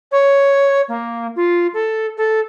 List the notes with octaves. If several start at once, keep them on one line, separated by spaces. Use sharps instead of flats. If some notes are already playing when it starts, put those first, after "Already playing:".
C#5
A#3
F4
A4
A4